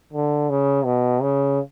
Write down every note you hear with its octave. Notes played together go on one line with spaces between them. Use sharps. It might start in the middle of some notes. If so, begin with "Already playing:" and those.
D3
C#3
B2
C#3